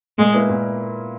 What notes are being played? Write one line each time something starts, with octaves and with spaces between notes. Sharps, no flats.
A#2 G#3
A#3 E4 B4
A#2